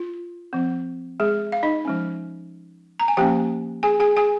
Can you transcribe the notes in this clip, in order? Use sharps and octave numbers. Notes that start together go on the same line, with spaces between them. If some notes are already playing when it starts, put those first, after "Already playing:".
Already playing: F4
F3 C4
G#3 G#4
F5
D#4 D#5
F3 G#3 C#4
A#5
G#5
F3 A#3 C#4 G4 G5
G#4 G#5
G#4 G#5
G#4 G#5